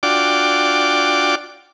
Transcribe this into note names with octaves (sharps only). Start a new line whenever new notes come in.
D4 F4 F#4 D5 G5 D6